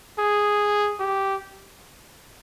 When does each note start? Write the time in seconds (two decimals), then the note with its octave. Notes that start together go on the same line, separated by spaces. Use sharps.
0.19 G#4
1.00 G4